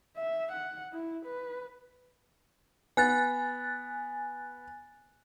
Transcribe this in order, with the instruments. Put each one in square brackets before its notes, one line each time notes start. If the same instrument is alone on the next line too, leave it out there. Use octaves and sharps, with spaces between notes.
[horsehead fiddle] E5
F#5
E4
B4
[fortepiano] B3 [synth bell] G#5 F#6 A6